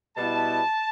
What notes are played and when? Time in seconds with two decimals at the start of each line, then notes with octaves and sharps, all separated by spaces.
0.16 B2 G3 B3 E4 A5